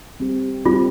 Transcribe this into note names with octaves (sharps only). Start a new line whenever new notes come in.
G3 C4 G4
G3 C4 F4 G4